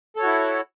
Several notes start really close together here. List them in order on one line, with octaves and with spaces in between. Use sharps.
A4 C#5 F#4 E4